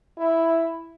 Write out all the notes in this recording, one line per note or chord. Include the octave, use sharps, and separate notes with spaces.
E4